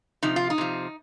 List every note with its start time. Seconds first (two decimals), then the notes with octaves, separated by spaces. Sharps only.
0.23 C3 F3 D#4
0.36 F4
0.50 D#4
0.58 C3 F3